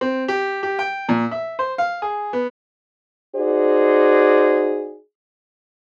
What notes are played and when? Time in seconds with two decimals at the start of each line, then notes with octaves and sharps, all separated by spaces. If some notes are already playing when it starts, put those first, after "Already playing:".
0.01 C4
0.28 G4
0.63 G4
0.79 G5
1.09 A#2
1.31 E5
1.59 C5
1.78 F5
2.02 G#4
2.33 B3
3.36 D#4 F#4 G#4 C5 D5